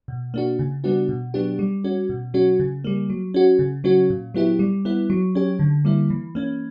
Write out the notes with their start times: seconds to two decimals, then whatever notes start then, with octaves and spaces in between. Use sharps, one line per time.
0.08 B2
0.34 A#3 D4 F#4
0.59 C#3
0.84 G3 B3 D4 F#4
1.09 B2
1.34 F#3 B3 D4 G4
1.59 G3
1.84 C#4 F#4
2.09 B2
2.34 F#3 C#4 F#4
2.60 C#3
2.84 G3 A#3
3.10 F#3
3.34 C#4 F#4
3.59 C#3
3.84 F#3 C#4 F#4
4.10 A#2
4.34 F#3 B3 E4 G4
4.59 G3
4.85 B3 E4
5.10 F#3
5.35 C#4 G4
5.59 D3
5.85 G3 A#3 E4
6.10 E3
6.35 A#3 C#4